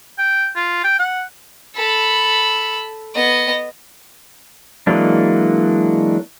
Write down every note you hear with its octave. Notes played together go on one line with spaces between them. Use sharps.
G5
F4
G5
F#5
A4 B5
B3 D#5
E3 F#3 G#3 A#3 D4